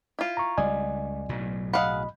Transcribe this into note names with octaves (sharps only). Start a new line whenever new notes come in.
E4 F4
A#5 C#6
C#2 G3 D5 D#5 G#5
B1 A2 F#3
G#4 D#5 F5 F#5 B5